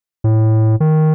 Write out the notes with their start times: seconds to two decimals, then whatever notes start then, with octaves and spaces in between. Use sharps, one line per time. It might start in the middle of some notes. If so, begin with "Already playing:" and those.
0.24 A2
0.80 D#3